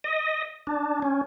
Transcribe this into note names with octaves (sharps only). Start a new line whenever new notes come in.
D#5
D4
C#4